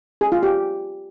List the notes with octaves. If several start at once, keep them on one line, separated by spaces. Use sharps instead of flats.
G#4
F4
G4